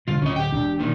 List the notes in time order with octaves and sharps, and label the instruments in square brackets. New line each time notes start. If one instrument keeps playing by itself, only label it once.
[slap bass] D3 G3 G#3 [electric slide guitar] F4
[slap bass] D1 D2 [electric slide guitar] C#4 D#5
[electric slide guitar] G4 G5
[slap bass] E1 D4
[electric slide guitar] A#2 D#3